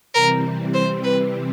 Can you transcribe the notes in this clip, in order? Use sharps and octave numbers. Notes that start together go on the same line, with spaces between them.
C3 E3 G3 C4 A#4
C5
B4